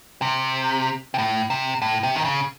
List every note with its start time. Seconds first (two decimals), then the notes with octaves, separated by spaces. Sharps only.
0.22 C3
1.14 C3
1.18 A2
1.50 C3
1.82 A2
2.03 C3
2.16 D#3
2.25 C#3